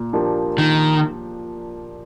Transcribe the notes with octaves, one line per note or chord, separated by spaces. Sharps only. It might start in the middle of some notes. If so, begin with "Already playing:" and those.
Already playing: A#2
F3 A#3 D4 G4
A#2 D#3